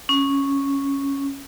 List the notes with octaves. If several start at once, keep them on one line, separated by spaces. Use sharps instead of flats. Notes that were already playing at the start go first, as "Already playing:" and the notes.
C#4